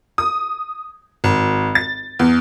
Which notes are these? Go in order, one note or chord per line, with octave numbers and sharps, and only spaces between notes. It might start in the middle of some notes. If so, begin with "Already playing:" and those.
D#6
G#1
A6
E2